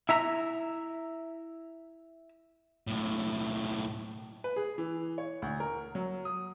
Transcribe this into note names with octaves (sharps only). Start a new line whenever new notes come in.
E4 E5 A#5
B1 A2
B4
G#4
E3
C#5
D2
A#4
F#3
D#6